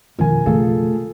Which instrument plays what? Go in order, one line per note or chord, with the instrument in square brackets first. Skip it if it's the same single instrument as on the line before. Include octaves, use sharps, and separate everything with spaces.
[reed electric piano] F2 B2 F3 [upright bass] D#3 D4 [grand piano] A#4 G#5
[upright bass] C#3 A3 [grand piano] F4 G#4 A4